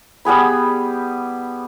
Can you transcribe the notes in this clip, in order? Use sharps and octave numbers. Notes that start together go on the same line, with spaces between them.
G3 B3 G#4 B5